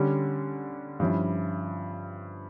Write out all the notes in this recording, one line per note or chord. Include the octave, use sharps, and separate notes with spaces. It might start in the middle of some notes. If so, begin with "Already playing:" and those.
Already playing: D3 G3 C#4
G2 F3 C#4 E4